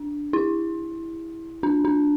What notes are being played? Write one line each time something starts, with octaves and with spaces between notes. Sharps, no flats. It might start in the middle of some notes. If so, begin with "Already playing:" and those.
Already playing: D4
E4
D4
D4